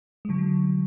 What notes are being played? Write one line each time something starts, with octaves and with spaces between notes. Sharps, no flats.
G#3
D3 F#3